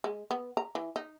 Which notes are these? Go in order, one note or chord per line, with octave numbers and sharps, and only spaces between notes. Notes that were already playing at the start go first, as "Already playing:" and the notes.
G#3
B3
A#5
E3
D#4